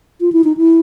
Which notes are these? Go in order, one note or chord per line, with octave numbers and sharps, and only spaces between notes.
F4
E4
D#4
E4